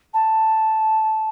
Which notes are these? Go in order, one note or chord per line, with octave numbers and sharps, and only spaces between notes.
A5